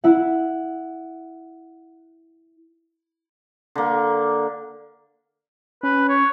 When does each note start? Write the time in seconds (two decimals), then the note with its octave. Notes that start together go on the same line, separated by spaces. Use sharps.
0.04 E4 F#5
3.75 D3 A#3
5.83 C#4 B4
6.09 C#5